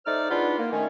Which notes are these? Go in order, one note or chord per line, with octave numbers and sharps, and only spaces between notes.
A3 D#4 C5 D5 F6
E2 D4 D#4 F4 F#5 B5
A#3
D#3 A3 C#4